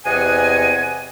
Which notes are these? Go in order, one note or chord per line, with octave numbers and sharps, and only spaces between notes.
E2 C3 D#5 F#5 G#5